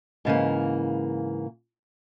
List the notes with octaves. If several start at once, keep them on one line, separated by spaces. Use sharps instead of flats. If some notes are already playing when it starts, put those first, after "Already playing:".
G#2 C#3 E3 A#3